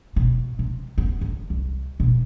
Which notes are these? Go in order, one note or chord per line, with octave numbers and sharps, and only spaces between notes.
B2
C3
B3
D3
C2
B2